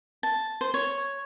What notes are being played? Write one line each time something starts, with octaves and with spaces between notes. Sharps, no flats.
A5
C5
C#5